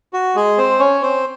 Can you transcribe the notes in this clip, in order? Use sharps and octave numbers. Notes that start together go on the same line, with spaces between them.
F#4
G#3 G#4
C4 C5
C#4 C#5
C4 C5